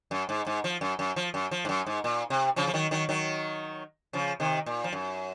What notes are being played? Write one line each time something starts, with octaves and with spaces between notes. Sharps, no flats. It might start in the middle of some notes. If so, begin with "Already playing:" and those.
F#2
G#2
G#2
F3
F#2
F#2
F3
F#2
F3
G#2
F#2
G#2
A#2
C3
C#3 F3
F3
D#3 F#3
D#3 F#3
D#3 F#3
C#3 F3
C3 D#3
A#2
F3
F#2